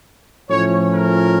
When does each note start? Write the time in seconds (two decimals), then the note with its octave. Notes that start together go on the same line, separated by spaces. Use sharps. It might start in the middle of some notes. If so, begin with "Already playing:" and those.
0.49 A2 F3 A3 C#4 C#5
0.93 A#4